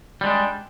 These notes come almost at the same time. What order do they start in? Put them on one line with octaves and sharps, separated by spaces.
G3 G#3 D4